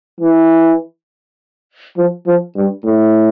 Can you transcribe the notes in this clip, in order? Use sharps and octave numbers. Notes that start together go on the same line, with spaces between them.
E3
F3
F3
G2
A2